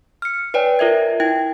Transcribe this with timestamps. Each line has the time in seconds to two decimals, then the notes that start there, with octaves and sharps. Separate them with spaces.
0.22 F6 C#7
0.54 B4 C#5 D5 G5 G#5
0.79 F4 A#4 E5 G#6
1.20 E4 G5 G#6